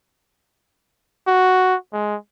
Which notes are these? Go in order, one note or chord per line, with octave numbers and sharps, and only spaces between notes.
F#4
G#3